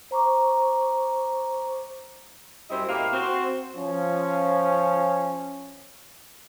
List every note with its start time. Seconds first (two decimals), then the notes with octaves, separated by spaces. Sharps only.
0.11 C5 A#5 C#6 D6
2.70 F#2 G3 C4 E4 C5 D#5
2.88 A2 A#3 E4 G4 A#4 F5
3.12 C4 F#4 C5
3.76 F3 C#4